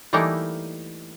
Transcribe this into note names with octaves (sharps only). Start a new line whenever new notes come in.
E3 G3 A3 A#3 D#4 E4